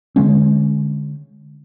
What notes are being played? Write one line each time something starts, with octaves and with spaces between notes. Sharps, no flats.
D3 G#3 C#4